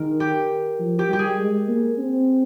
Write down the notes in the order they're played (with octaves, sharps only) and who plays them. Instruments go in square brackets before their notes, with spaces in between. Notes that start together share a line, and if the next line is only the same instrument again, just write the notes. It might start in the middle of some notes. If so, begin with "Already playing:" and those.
Already playing: [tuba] D#3 [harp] G#4 A#4
[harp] G4
[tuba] F3
[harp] G4
[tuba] G3 [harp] G4
[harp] G#4
[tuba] G#3
A#3
C4